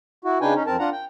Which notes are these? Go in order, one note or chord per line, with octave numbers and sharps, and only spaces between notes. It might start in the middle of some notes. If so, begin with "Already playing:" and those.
E4 F#4
C#3 D4 D#4 B4 G5 G#5
C#4 D#4
F2 C4 A#4 A5
D4 F4 F#5 A#5
G5